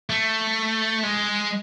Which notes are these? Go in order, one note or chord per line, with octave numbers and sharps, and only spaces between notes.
A3
G#3